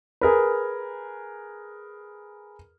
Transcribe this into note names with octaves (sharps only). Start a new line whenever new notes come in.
G#4 A#4 B4